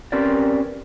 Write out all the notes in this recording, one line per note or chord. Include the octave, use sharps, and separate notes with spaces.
C4 C#4 G4 A#4 B4 D5